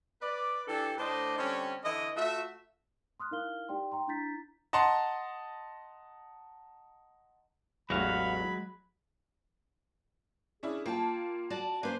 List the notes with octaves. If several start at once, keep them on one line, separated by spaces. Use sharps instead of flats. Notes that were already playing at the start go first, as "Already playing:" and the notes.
B4 D5
E3 D4 G4 A4
A2 A3 D4 C5 D5 D#5
D3 G3 C4 C#4
D3 E3 E4 D#5
A3 F4 F#4 E5
C6 D#6 F6 F#6
D#4 E4 A#4 F5 F6 G7
D#4 G4 D5 G5 C6
G5 A#5 C6
D4 E4 A#5 G6 A6 B6
D#5 F#5 A5 A#5 C6
A1 E2 F#3 G#3 F#4 F5 B5
C#4 D4 E4 G#4
A#3 F4 G5 A5
F#4 D5 A5
A#3 C#4 B4 C5